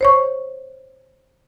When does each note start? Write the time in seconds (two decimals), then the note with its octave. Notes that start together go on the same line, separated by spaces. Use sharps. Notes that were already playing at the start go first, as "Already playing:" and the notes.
0.01 C5 C#5 C#6